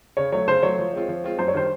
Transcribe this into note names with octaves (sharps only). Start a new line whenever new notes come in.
C#3 C#5
F#3 A3 C#5
C#3 C5
F#3 A3 C#5
F3
G#3 C4 F4
F3
G#3 C4 F4
F#2 C5
C#5
D#3 G3 C5